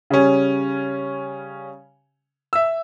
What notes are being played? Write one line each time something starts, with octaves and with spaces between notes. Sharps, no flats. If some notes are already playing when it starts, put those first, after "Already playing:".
C#3 G3 C#4
E5 E6